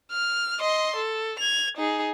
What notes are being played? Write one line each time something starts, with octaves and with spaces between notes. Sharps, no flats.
F6
D#5 C6
A4
G#6 F7
D#4 G#4